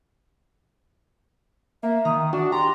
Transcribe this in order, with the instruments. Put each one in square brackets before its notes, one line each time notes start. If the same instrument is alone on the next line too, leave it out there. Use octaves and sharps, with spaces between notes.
[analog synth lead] A#3 [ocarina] E5
[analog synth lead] D#3 [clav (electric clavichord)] A#5 [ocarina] D#6
[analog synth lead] D4 [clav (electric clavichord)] F#4 [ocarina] F#5
[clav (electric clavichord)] G4 [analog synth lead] A#5 [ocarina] C6